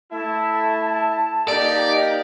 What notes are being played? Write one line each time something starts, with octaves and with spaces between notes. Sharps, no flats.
A3 E4 A5
A#3 D#4 G4 D5